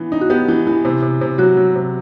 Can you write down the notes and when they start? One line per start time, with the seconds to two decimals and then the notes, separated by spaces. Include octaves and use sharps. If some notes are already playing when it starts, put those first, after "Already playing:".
Already playing: E3 B3
0.12 D#4
0.21 F#4
0.30 B3 G4
0.48 E3
0.67 E3
0.85 C3
1.02 C3
1.21 C3
1.38 F#3 F#4
1.57 F#3
1.76 C3